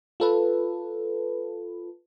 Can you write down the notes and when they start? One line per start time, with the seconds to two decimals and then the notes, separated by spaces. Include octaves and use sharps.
0.20 F4 A4 B4